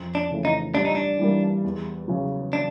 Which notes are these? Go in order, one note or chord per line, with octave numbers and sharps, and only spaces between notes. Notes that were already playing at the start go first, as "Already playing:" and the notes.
Already playing: F2
D4
C#3 E3 A3
D#4
G2 D4
D#4
D4
E3 G3 A#3
E2
C#3 F#3
D4